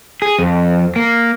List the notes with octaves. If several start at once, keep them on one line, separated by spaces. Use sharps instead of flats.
G#4
F2
A#3